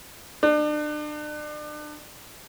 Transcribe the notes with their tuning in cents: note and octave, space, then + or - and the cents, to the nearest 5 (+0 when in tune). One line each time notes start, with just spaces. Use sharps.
D4 +35